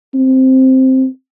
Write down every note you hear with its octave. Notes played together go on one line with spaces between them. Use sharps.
C4